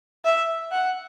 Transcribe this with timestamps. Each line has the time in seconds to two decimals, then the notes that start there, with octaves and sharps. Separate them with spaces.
0.25 E5
0.71 F#5